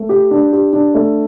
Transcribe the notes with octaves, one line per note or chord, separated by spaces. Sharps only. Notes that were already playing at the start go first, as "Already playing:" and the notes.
Already playing: A3
G4
D4
G4
D4
A3